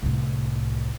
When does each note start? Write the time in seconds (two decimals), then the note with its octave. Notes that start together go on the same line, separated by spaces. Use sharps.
0.03 C2 A2